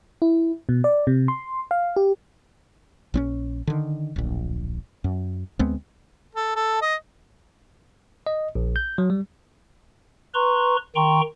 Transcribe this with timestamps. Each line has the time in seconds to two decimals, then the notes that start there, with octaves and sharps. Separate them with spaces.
0.22 E4
0.69 B2
0.84 D5
1.07 C3
1.28 C6
1.71 F5
1.96 G4
3.14 A#1 C4 C#4
3.67 D3 D#3
4.16 D1 A#1
5.04 F#2
5.59 D2 G#3 B3 C4
6.35 A4
6.56 A4
6.82 D#5
8.27 D#5
8.55 A#1
8.76 G6
8.98 F#3
9.10 G3
10.34 B4 A#5 C6 C#6
10.96 D#3 G5 A#5 C6 C#6